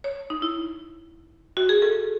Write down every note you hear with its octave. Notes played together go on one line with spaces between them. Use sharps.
C#5
D#4
E4
F#4
G#4
A4